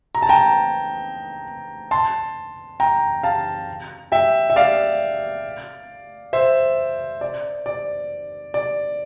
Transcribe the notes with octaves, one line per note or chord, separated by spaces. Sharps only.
A#5
A5
G5 A#5
A5 C6
G5 A#5
F5 A5
E5 G5
E5
D5 F5
C5 E5
D5
D5
D5